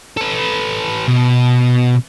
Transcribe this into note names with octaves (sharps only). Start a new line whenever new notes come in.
A4 B4
B2